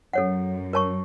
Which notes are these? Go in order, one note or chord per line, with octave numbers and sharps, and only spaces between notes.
F#2 A4 C#5 F#5
A#4 C#5 A5 C#6